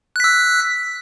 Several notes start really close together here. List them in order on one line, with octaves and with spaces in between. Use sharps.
F#6 B6 E6